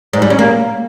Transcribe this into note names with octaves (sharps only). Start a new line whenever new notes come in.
G#2
G3
C#4
A#3